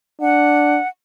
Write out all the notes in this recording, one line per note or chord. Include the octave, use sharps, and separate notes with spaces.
D4 F#5